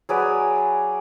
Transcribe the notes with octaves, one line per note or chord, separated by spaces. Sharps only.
F#3 G#4 B4 D5